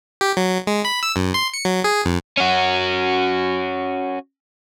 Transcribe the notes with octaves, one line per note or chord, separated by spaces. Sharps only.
G4
F#3
G#3
B5
E6
F#2
C6
C#7
F#3
G#4
F2
C#4 F#4